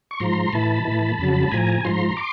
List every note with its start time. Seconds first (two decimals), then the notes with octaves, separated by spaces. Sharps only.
0.11 C#6
0.20 G#2 F3 A#5 C6
0.53 A2 E3 A5 B5
0.85 A2 E3
1.19 F2 C#3 F#3
1.41 A5
1.51 A2 F3 G#5 A#5
1.85 G#2 F3 A#5 C6
2.17 C6 D6